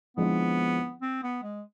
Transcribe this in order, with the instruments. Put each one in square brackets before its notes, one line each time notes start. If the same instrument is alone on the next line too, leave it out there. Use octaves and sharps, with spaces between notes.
[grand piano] D3 F3 G#3 C4 E4 [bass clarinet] B3
[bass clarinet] C4
B3
G#3